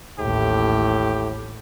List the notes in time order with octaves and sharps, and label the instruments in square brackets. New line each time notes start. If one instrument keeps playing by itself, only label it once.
[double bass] A1 D#2 [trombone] A2 [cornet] G4